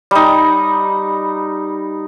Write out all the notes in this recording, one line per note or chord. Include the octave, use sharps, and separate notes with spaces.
G3 D#4